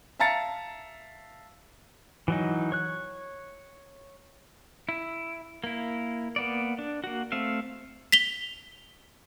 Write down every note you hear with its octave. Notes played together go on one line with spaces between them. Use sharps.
E5 F5 A5 A#5 A6 C#7
E3 F#3 D#4
C#5 F#6
E4
A#3 E4
A#3 B3 D5
D4
A#3 F#4
A3 C4 E5 F5
B6 F7 G7